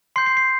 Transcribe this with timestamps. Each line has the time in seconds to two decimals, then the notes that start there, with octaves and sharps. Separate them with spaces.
0.16 C6 G6 C7
0.26 C7
0.37 C7